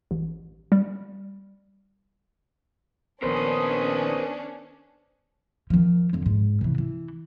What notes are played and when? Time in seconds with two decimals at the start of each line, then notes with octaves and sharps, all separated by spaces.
0.11 A1
0.72 G3
3.23 A#1 D#3 B3 C#4 D4 A#4 C5 D#6
5.70 D#3 F3
6.13 F2 D3
6.26 G#2
6.61 C3 E3
6.78 E3